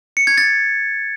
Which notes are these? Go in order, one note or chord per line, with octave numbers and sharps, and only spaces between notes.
C#7
G#6
A6